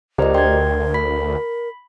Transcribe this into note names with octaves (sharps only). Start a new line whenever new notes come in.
C#2 G4 A#4 C5 D5 D#5 A#5
D2 A#4 G5 C6 G#6
B5 B6